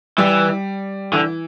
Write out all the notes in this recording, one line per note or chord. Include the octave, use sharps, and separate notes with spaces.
E3 G3
D3 E3